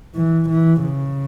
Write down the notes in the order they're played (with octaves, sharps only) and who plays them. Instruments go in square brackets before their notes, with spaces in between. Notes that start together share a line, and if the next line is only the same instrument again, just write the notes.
[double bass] E3
E3
C#3